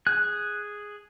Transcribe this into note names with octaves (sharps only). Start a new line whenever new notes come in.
G#4 F#6